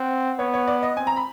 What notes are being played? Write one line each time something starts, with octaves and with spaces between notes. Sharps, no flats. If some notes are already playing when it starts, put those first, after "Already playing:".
Already playing: C4 F#5
B3 C#5
C#5
D5
D#5
C4 G#5
A#5
B5